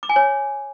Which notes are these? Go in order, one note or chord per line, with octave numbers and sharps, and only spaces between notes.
D6
G#5
C#5